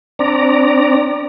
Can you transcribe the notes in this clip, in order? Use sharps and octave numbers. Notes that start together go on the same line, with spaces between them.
C4 D4 D5 A#5